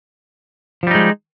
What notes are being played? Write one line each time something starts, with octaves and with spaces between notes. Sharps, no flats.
F3 G3 G#3 D#4